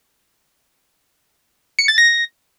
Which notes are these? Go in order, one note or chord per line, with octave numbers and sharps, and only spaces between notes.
C#7
A6
A#6